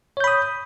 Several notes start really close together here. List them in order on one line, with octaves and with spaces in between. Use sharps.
C#5 G6 B5 D#6